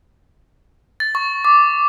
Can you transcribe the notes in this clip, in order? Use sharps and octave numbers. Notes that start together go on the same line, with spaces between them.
A6
C#6
D6